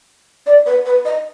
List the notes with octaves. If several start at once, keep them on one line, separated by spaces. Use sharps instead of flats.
D5
B4
B4
D#5